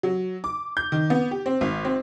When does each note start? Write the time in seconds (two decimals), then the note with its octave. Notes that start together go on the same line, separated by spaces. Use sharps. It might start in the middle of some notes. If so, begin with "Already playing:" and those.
0.03 F#3
0.44 D6
0.77 G6
0.92 D#3
1.10 B3
1.31 G4
1.46 C4
1.61 G#1
1.85 C4